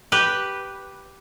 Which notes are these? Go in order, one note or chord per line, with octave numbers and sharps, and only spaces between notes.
G4 B4